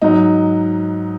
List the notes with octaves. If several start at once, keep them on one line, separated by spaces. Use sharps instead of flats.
G#2 F#3 D#4